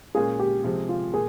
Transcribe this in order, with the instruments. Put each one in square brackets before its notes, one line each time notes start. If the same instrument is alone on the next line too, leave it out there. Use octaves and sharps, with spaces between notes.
[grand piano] A#2 G#3 C#4 F4 [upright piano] G#4
[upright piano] G4
[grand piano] C3 F3 G#3 [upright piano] G4
[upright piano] F4
[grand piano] A#2 [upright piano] G#4